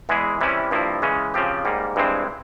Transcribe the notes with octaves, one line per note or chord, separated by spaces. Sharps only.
E2 E3 G#3 E4 G#4
C3 E3 G3 C#4 E4
G2 F3 A#3 E4
C#3 E3 G#3 C#4
C#3 F3 C4 G4
G#2 G3 A#3
G2 E3 G#3 C4